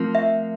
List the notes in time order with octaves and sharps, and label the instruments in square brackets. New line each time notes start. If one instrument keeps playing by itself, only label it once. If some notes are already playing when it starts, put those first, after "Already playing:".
Already playing: [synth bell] F3 A3 C4 F4 A#4
[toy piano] E5